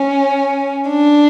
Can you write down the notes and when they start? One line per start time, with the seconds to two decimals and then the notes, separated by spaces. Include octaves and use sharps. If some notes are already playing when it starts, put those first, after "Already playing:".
Already playing: C#4
0.89 D4